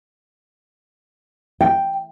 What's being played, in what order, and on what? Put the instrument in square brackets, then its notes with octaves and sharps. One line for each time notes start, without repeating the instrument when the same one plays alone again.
[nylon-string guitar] G5